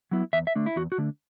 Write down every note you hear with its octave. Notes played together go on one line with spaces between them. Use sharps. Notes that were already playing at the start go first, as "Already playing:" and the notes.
F#3 B3 E4
E2 E5
E5
D3 A3 D4
E4
E2 F#4
F#4
D3 A3 D4